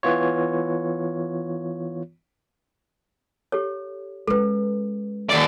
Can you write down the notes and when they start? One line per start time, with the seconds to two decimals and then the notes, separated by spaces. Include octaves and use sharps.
0.03 E3 B3 F4 C#5
3.52 G4 A4 C#5
4.27 G#3 C#4 A4 B4
5.30 D#2 D5